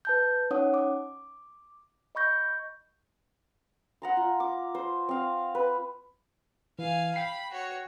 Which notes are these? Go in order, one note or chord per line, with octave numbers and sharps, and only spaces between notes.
B4 A5 G6
C#4 D#4 C#5 F#5 D#6
D6
D#5 B5 C#6 G6 A#6
F#5 A#5 C6
F4
D6
C5
C4 F5
B4
E3 F5 G#5
G5 B5 C7
F#4 C#5